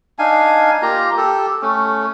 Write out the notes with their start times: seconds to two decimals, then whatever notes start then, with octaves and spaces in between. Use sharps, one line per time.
0.19 D4 D#4 F5 G#5
0.82 A#3 F4 G4 A#5
1.17 G4 A4
1.62 A3 C#4